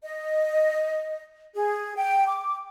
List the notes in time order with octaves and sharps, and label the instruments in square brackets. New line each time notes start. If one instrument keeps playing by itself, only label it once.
[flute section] D#5
G#4
G5
D6